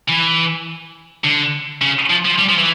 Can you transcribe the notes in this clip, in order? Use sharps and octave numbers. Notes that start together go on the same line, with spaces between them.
E3
D3
C#3
F3
F3
G3
F3
E3